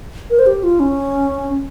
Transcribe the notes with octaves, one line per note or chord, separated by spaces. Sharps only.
A#4
C5
G4
F4
C#4